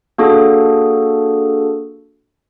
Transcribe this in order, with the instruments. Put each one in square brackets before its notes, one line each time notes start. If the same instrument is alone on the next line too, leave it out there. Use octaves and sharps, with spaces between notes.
[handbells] A#3 D4 F#4 G#4 A4